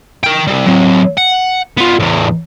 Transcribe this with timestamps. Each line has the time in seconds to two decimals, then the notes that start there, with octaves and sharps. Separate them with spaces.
0.23 A#4 G5
0.47 G3 C4
0.66 F#3 C4
1.18 F#5
1.77 B3 F4
1.99 E2 A2